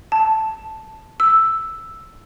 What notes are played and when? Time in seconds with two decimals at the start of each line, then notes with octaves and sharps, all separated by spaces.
0.12 A5
1.20 E6